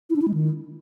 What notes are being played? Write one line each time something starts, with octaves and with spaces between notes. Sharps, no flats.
E4
D4
E4
G#3
D#3